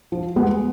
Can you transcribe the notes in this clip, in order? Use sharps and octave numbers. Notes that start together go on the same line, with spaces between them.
F3
G#3 B3